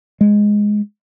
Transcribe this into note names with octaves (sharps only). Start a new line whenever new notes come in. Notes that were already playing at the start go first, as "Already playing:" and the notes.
G#3